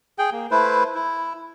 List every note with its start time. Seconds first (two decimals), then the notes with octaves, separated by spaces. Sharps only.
0.18 G#4 G5
0.32 A#3
0.51 A3 E4 B4 C5
0.95 E4